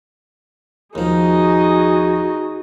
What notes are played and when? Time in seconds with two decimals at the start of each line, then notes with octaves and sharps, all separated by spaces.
0.95 D#2 F3 D#4 F#4 G#4